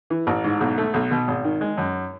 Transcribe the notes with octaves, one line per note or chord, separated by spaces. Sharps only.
E3
A1
G#2
B1
A3
B1
B2
G#1
D#3
G#3
F#2